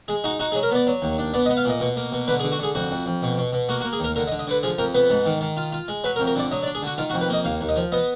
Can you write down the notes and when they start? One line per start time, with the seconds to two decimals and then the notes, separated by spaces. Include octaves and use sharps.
0.08 G#3 G#4
0.24 D#4 F#4
0.39 D#4 F#4
0.52 G#4
0.55 F#3
0.63 A#4
0.71 B3 D5
0.87 F#3
1.02 D#2
1.19 D4
1.34 B3 D5
1.46 D#5
1.49 B3
1.57 F5
1.65 A#2 D#5
1.80 B2
1.96 A#3
2.12 B2
2.28 D3 B4
2.40 G#4
2.43 D3
2.51 F#4
2.59 D3 G#4
2.75 F2 F#4
2.91 F2
3.06 F2
3.22 B2
3.37 B2
3.53 B2
3.69 A#3 F#4
3.81 F#4
3.84 A#3
3.93 G#4
4.00 D#2 A#4
4.16 D3 A#4
4.27 D#5
4.32 D3
4.39 D#5
4.47 D3 B4
4.63 F3 G#4
4.78 F2 A#4
4.94 B3 B4
5.10 G#2
5.26 D#3
5.41 D#3
5.57 F4
5.72 F4
5.88 G#3
6.04 F#3 B4
6.16 A#4
6.20 F2
6.27 A#4
6.35 D3 D5
6.51 F#3 D#5
6.63 D5
6.66 D4
6.75 G#4
6.82 D3 F#4
6.98 D#3 F4
7.10 F#4
7.13 F2
7.21 B4
7.29 A#3 D#5
7.44 D#2 F5
7.61 D#2
7.69 D#5
7.76 F3
7.92 B3 D#5